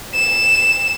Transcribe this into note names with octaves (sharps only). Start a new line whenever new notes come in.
E7